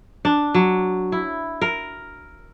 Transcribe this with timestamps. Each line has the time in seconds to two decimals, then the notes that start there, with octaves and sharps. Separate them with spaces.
0.25 D4
0.54 F#3
1.12 E4
1.62 A#4